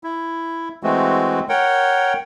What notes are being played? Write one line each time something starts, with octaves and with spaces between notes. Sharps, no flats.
E4
E3 G#3 A3 C4 F#4
A#4 C#5 F#5 G5